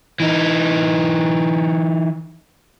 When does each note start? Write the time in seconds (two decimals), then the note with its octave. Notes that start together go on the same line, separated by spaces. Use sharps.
0.20 E3 D#4